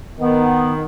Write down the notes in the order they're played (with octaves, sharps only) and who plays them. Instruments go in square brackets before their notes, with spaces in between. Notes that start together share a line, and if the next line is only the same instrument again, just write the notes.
[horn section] D#3 [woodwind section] B3